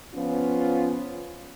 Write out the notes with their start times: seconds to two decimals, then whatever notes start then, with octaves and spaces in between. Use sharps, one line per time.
0.15 F3 B3 C#4 F4